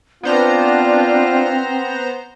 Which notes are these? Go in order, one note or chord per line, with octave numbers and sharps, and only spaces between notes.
B3 C4 D4 F4 C5 A#5